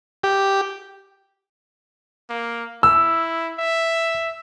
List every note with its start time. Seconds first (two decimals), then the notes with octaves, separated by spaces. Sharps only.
0.24 G4
2.30 A#3
2.83 E4 E6
3.59 E5